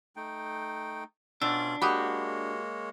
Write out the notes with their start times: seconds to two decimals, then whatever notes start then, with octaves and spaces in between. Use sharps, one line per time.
0.16 A3 D#4 G5
1.42 B2 C#4 D4 F4 D5 E6
1.82 G#3 A#3 F#4 G4 C#5 B5 D6 D#6